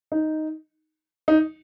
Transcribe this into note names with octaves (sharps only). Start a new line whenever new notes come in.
D#4
D#4